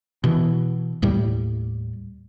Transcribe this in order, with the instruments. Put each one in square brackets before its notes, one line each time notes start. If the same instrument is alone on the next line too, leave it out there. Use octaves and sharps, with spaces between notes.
[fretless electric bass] B2 E3
D#2 A2 G3